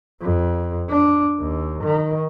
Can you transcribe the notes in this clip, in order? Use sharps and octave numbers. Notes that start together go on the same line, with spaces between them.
F2
D4
D#2
D#3